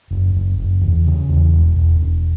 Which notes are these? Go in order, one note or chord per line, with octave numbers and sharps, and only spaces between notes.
F#1
F#1
F#1
E2
C#3
E2
E1
E1
E1